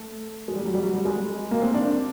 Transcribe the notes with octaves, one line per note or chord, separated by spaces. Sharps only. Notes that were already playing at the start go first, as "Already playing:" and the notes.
Already playing: A3
G#3
G3
F#3
G3
F#3
G3
G#3
A#3
C4
D4